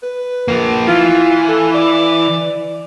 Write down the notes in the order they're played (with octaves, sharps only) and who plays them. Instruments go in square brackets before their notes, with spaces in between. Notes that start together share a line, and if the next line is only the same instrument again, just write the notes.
[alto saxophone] B4
[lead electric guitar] F3 A#3
[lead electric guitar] E3 [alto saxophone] F4
[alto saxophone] A4
D5